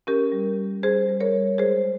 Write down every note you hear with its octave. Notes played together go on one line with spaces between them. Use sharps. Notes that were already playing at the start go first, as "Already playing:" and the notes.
C#4 G4 A#4
G3
G3
G3 G#4 C5
G3
A#4 C#5
G3
G#3 G#4 C5